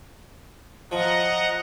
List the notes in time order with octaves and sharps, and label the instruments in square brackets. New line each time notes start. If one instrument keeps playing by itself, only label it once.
[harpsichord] F3 [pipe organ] D#5 F#5 A#5